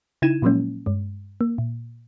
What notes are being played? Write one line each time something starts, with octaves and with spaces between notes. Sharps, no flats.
C#3 D#4 E4 G#6 D#7 E7
A#2 F3 F#3 G#3 A#3 C#4
G2 G#3
A#3
A#2